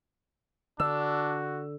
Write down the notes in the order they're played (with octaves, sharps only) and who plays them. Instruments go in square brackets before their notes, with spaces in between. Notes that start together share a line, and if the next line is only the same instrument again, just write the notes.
[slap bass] D3 [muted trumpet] D4 [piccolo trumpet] F#4 [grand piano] E6